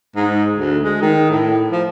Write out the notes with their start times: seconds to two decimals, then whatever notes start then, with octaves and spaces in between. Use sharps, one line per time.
0.16 G#2
0.57 D2
0.83 G#3
1.02 D#3
1.30 A2
1.72 F3